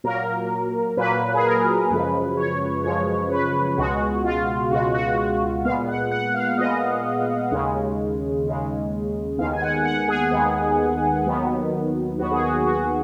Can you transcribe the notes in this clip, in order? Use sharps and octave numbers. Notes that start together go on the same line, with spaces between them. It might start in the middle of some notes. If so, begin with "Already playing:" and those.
A#2 F#3 A#3 A#4
A#2 F#3 A#3 B4
G#4
A#4
F#2 C#3 F3 G#3 B4
C#5
F#2 C#3 F3 G#3 C#5
B4
C#2 B2 G#3 F#4
F4
C#2 B2 G#3 F#4
F#4
F#4
A#2 G#3 B3 F5
F#5
F#5
F5
A#2 G#3 B3 D#5
D#2 C#3 G#3
D#2 C#3 G#3
D#2 D#3 G#3 B3 F5
G#5
F#5
F#5
G#4
D#2 D#3 G#3 B3
D#2 D#3 F#3 B3
D#2 D#3 F#3 B3 F#4
G#4
F#4
F#4